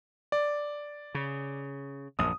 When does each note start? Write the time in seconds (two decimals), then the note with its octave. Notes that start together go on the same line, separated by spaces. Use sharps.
0.32 D5
1.15 C#3
2.19 A#1 F#2 D#6